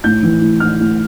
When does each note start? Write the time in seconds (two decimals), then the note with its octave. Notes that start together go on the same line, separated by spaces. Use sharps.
0.04 A2 G6
0.23 E3
0.42 A2
0.60 A2 F6
0.81 A2